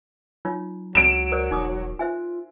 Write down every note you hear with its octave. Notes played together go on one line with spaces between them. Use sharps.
F#3 D#4 F4 C#5
C#2 F#3 D7 E7
A#4 C5 D5
E1 D#4 D6 D#6
F4 C5 E5 G#5